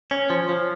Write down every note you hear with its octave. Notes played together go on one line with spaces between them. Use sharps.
C#4
F3
F3